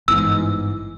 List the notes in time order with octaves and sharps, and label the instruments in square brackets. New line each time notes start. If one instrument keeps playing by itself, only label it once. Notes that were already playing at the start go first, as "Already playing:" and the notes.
[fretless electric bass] G1 G#2 [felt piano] E3 [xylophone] E6